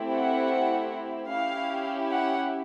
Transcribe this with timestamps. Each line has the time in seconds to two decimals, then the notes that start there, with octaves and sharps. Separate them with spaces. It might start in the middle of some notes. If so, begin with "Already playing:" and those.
Already playing: A3 C4 E4 G4
0.12 F#5
1.32 C#4 E4 G4 F5
2.11 F#5